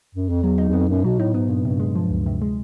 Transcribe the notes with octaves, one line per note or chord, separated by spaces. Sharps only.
F#2
F2
E2 F#3
D#4
E2
F2 B3
F#2 A#2
B2 F#3
A2 D#4
G#2 B3
G2 A#2
G2 C3
G#3
F3
D2
C3
G#3